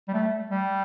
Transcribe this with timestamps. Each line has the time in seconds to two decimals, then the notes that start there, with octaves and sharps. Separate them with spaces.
0.08 G3
0.14 A3
0.50 G3